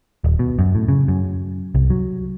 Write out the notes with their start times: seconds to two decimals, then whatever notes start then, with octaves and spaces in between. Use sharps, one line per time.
0.24 D#1
0.39 B2
0.59 F#2
0.75 A2
0.88 C#3
1.08 F#2
1.75 C2
1.90 F#3